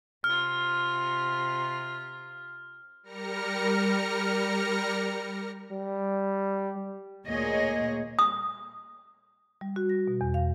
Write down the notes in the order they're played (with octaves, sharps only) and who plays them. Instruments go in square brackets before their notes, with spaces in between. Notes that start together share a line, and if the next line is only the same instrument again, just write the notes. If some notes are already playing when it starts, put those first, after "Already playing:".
[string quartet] C3 F4 [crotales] F6
[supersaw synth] G3 A#4 F6 A#6 C#7
[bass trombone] G3
[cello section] D2 A#2 A#3 G#4 C#5 D#5
[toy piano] D#6
[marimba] G3
F#4
A#6
B2
E2
F5